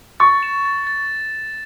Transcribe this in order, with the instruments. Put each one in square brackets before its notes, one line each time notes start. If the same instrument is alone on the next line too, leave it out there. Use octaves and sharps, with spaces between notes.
[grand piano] C#6 [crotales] A6
[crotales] E7
A6
A6